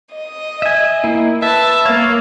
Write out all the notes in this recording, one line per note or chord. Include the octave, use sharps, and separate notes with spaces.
D#5
E5 G#5
A#3 E4
B4 E5 A5
A#3 C#5 F5